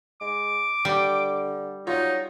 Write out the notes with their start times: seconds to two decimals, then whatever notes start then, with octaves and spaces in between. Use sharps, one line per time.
0.21 G#3 D6
0.85 D3 G3
1.87 F#3 D#4 F4 C#5